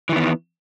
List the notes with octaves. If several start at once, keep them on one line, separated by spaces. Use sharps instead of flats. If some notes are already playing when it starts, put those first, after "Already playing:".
D#3 E3 B3